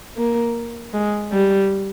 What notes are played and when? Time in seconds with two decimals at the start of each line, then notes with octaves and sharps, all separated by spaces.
0.17 A#3
0.94 G#3
1.33 G3